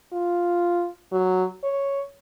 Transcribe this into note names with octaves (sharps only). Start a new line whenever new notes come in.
F4
F#3
C#5